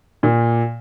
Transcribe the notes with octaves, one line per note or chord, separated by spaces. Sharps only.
A#2